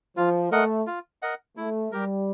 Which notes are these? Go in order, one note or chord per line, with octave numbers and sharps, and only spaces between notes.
F3 F4
A3 A#4 D#5 F#5
F4
A#4 D#5 F#5
A3 E4
G3 G4 A#4